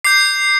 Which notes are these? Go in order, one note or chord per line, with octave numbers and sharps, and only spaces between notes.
D6 G6 C7